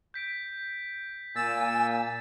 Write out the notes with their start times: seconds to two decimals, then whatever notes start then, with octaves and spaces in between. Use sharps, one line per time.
0.14 G6 B6 D7
1.36 A#2 G#5 E6 A6 E7